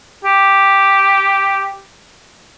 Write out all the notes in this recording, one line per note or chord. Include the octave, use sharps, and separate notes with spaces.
G4